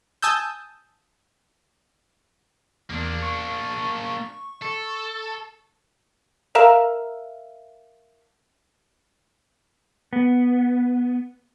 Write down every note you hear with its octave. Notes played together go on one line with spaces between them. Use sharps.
G#5 A5 D#6 E6 G6
E2 A#3 D4
C#6
A4
A#4 E5 F5
B3